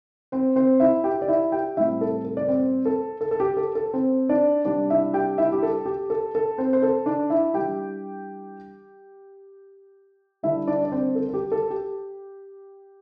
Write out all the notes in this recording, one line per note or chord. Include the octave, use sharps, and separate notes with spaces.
C4 C5
C4 C5
E4 E5
G4 G5
D5
E4 E5
G4 G5
A2 G3 C4 E4 E5
A4
A4
D5
C4 C5
A4
A4
A4
G4
A4
A4
C4 C5
D4 D5
C3 G3 D4 D5
E4 E5
G4 G5
E4 E5
G4
A4
G4
A4
A4
C4 C5
C5
A4
D4 D5
E4 E5
E3 G3 D4 G4 G5
D3 G3 D4 E4 E5
D4 D5
D5
C4 C5
A4
A4
G4
A4
G4